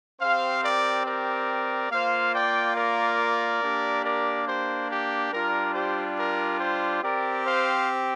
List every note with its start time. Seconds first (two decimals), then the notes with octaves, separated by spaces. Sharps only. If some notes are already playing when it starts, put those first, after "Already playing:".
0.21 C4 G4 C5 F5
0.63 A#4 D5
1.06 A#4 D5
1.91 A#3 F4 C5 F5
2.34 D5 G5
2.76 A#4 D5
3.62 A#3 D4 G4
4.05 A#4 D5
4.47 G4 C5
4.90 G4
5.33 G3 D4 F4 A#4
5.74 G4 C5
6.18 A#4
6.60 G4 C5
7.02 C4 G4 A#4 D5
7.45 C5 F5